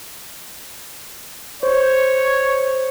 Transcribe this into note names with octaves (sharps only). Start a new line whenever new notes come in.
C5 C#5